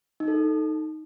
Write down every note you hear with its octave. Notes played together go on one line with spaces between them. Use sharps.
D#4
A4
D#4